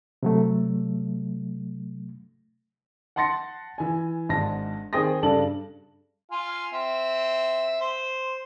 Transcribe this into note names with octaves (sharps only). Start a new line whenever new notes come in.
C3 F#3 A3
F#5 A5 C6 A6 A#6 C#7
E3 G#5
G#1 G#2 D4 A5 A#6
D#3 C4 G#4 G5 D#6 A#6
G2 C#3 D4 A4 A5 F#7
F4 F5 G#5
C4 E5
C5